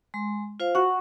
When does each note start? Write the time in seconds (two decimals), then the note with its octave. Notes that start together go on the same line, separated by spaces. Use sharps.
0.14 G#3 C6
0.60 F4 C5 F5
0.75 F#4 F#5